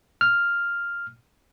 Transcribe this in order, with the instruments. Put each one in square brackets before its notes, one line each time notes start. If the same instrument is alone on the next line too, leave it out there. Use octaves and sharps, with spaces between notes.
[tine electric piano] F6